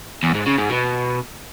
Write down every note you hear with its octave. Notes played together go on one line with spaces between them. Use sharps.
E2
G#2
C#3
G#2
B2